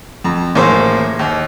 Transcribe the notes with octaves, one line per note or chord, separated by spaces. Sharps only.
F2
A1 A2 A#3 G#4 C5
D#2